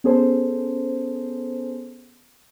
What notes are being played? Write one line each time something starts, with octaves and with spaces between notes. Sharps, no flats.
B3 C#4 G#4 A4 C5